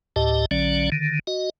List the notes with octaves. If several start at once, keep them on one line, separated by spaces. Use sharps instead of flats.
D2 A2 G4 D#5 A5
A#1 D3 F#3 C#4 D5
D3 D#3
F#4 D#5